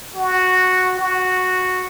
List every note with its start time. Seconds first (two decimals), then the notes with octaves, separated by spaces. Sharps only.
0.16 F#4
1.00 F#4